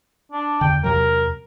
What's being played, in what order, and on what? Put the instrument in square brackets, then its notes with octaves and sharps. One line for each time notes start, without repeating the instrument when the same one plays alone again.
[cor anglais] D4
[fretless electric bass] E2 D3 [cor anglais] G5
[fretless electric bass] E2 C3 F#3 [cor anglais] A#4